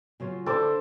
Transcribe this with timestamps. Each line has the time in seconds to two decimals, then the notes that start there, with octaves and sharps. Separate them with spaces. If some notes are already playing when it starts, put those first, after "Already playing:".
0.20 C#3 F#3 F4
0.46 D3 E4 A4 C5 A5 D6